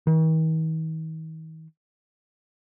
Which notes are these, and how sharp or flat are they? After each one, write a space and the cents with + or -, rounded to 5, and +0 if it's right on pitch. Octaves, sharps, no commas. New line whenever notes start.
D#3 +45